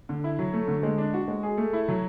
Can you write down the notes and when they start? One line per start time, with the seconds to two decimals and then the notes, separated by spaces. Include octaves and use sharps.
0.09 D3
0.24 E4
0.39 F#3
0.53 A3
0.68 D3
0.83 G#3
0.98 D4
1.14 F#4
1.28 G#3
1.43 G#4
1.57 A3
1.73 E4
1.88 F#3